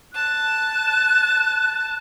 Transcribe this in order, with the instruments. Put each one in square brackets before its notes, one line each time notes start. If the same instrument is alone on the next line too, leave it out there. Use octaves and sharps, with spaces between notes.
[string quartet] A5 [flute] F#6